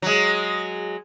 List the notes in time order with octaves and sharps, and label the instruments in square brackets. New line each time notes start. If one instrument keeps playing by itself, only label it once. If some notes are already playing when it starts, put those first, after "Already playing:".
[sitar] F#3 G#3